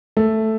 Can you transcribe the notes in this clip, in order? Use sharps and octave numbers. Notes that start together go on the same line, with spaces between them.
A3